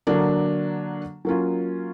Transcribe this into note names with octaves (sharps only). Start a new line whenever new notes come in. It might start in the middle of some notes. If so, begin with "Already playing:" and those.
D3 F#3 A#3 D4
F#3 A#3 C#4 F4